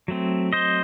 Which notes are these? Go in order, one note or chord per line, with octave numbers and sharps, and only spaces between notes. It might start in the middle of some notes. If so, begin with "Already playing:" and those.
F#3 A3 C4
C5 D#5